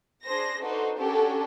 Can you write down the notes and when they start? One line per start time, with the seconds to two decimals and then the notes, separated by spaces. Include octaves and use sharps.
0.24 D4 G#4 C5 A#6
0.61 D4 D#4 F#4 A4 B4 C5
0.98 C#4 D4 F#4 G4 A4 A#4